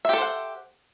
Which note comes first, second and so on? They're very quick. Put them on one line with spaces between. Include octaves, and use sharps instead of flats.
E5 G4 A4 C5 F#5